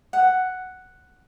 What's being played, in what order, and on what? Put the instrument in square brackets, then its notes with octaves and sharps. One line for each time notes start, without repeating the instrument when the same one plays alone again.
[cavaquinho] F#5